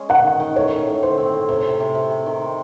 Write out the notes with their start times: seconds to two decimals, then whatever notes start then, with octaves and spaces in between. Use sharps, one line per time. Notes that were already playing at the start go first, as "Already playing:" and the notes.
Already playing: G#3 C#4 G#4
0.09 D#3 F#5
0.25 D#3
0.40 D#3
0.56 A2 C#5
0.71 A2
0.87 A2
1.03 A2 C5
1.18 C4
1.34 A2
1.49 C3 C5
1.64 C3
1.80 C3
1.95 C3
2.10 C3
2.26 D#3
2.41 C4